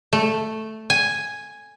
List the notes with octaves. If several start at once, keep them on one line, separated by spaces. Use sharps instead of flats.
A3
G#5